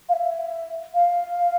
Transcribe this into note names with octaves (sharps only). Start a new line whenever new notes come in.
F5
E5
F5